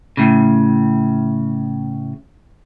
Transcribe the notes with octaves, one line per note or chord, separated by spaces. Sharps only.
A2 C#3